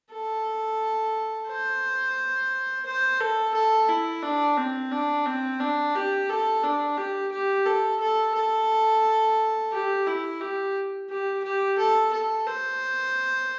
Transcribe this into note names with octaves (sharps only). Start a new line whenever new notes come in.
A4
C5
C5
A4
A4
E4
D4
C4
D4
C4
D4
G4
A4
D4
G4
G4
A4
A4
A4
G4
E4
G4
G4
G4
A4
A4
C5